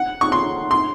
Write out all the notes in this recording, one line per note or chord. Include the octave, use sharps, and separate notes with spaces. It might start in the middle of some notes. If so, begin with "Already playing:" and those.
Already playing: F#5
C#6
C6
C6